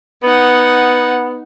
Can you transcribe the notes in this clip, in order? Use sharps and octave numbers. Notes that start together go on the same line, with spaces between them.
B3 D#4 F#5